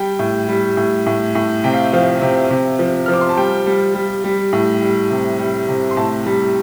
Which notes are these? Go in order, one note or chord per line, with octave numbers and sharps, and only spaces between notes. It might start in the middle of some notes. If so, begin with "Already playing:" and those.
Already playing: G3 G5
A2
G3
A2
A2
A2
C3 G5
F5
F3 F5
C3
C3
F3
F3 F6
D6
C6
A5
G3 G5
G3
G3
G3
A2
G3
C3
G3
C3
C6
A2 A5
G3